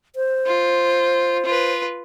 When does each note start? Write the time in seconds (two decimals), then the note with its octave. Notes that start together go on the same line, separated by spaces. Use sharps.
0.16 C5
0.47 F4
1.45 F4 B4